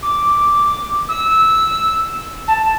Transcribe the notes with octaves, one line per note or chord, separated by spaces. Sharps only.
D6
E6
A5